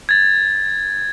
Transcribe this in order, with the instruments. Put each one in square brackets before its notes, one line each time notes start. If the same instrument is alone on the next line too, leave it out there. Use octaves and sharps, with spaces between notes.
[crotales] G#6 A6